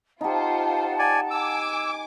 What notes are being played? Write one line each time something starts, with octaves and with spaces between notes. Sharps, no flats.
D#4 F4 G4 C5 F#5 A5
D5 G#5
G#5 D6 E6